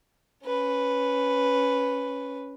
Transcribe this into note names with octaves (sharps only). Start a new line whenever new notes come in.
C#4 B4